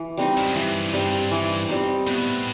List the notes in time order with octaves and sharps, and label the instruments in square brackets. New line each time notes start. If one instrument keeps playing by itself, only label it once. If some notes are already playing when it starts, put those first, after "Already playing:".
Already playing: [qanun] E3
G3 C4 D#4
[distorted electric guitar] F2
F#2
[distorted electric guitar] G2 [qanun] E3
[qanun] G3 C4 D#4
E3
G3 C4 D#4
[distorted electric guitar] A2 [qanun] B3